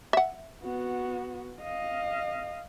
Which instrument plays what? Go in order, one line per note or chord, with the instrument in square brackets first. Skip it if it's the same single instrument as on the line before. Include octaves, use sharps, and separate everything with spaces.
[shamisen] E5 F#5
[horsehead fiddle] B3 F#4
D#5 F5